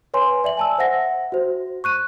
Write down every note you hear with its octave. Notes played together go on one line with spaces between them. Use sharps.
B4 C#5 G#5 C6
D5 E5 F#7
G#5 A5 E6
C5 E5 F#5 A#6
F#4 C5
C#6 F#6 D#7